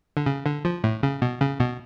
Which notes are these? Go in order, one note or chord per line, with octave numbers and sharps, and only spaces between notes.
D3
C#3
D3
F3
A2
C#3
B2
C#3
B2